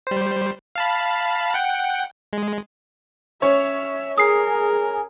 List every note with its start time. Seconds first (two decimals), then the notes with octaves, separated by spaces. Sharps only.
0.07 G3 C5
0.76 F5 A5 B5
1.54 F#5 G5
2.33 G#3
3.42 C#4 C#5 E5
4.18 G#4 A#4 D#6 C7